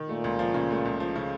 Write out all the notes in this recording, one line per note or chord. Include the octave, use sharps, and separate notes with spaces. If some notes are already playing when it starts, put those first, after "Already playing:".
Already playing: D#3
A#2 A3
C#2
F3
C#3
A3
C#2
F3
C#3